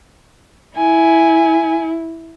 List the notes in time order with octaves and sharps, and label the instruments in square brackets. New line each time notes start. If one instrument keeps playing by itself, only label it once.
[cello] E4 [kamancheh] G#5